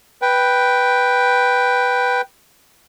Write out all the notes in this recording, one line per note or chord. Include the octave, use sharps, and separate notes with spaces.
B4 G5